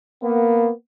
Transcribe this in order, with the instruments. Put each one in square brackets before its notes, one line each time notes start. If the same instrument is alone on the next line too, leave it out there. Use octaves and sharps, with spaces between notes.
[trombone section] A#3 B3